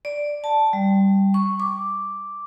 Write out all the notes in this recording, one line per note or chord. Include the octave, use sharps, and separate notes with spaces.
D5
A5
G3
C#6
D6